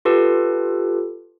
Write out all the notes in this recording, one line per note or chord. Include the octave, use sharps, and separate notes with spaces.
F4 G4 A4 B4